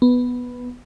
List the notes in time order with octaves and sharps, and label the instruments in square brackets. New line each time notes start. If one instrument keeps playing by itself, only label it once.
[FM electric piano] B3